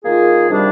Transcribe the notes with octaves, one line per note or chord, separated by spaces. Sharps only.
D#3 A#3 F4 G#4
C3 D#3 G3 D4